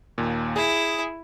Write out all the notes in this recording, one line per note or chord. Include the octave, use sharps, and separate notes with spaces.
D#2 A#2
E4 G#4